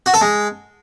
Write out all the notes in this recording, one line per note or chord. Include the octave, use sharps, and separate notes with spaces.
F#4
A4
G#3